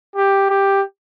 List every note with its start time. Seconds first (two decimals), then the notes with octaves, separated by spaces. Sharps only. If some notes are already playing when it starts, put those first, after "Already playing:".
0.16 G4
0.50 G4